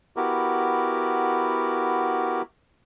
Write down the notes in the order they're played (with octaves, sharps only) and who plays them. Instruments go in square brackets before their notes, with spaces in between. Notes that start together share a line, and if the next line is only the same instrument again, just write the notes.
[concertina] B3 E4 F#4 G4 A#4